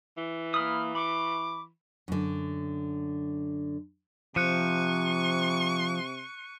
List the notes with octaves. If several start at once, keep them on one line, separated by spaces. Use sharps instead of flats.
E3
A#3 B5 D#6 F6
B5 C#6 D6
F#2 D3
C3 F3 C#6 F#6 C#7 D#7